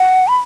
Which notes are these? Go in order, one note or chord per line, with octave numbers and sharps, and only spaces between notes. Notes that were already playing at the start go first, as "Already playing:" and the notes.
Already playing: F#5
B5